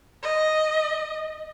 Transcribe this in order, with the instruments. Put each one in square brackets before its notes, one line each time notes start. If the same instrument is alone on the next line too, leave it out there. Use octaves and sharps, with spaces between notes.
[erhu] D#5